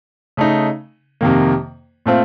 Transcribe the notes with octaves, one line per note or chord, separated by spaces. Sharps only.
C#3 A3 D#4
F2 C3 D#3 A#3
A#2 A3 C4 F4